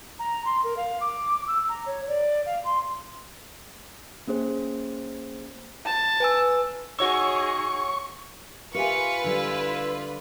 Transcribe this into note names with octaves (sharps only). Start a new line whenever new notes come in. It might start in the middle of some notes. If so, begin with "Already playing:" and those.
A#5
C6
A#4
F5
D6
E6
A#5
C#5
D5
F5
C6
A#3 C#4 G#4 C5
A5
B4 G#5 E6
D#4 F#4 G#4 C#5 C#6 E6
F4 G4 A#4 B4 E5 G#5 C#6
D3 G3 E4